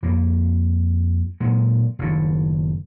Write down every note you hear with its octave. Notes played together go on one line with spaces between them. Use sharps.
F2 A#3
A#2 F#3 G#3
F#1 A2 D#3